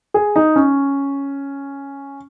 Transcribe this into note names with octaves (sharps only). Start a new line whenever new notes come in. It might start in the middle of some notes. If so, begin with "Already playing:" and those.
G#4
D#4
C#4